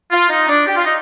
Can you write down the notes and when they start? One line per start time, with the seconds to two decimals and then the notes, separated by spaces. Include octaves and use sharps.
0.11 F4
0.29 D#4
0.48 D4
0.67 G4
0.75 F4
0.85 D#4